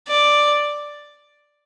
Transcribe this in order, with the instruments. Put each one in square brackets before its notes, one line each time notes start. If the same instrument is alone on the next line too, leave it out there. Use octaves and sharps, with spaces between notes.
[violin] D5